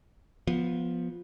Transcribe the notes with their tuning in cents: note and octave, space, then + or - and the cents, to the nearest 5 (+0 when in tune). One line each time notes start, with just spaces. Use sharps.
F3 +5 B3 -10